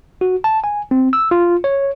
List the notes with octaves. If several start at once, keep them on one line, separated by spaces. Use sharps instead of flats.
F#4
A5
G#5
C4
E6
F4
C#5